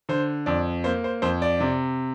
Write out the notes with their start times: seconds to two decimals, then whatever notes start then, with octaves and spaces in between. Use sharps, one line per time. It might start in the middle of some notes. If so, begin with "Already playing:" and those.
0.09 D3 C5
0.46 F2 D5
0.84 A#3 C5
1.04 C5
1.22 F2 C5
1.42 D5
1.60 C3